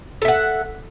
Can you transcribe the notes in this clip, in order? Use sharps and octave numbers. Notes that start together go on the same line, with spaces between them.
A4 E5 F#5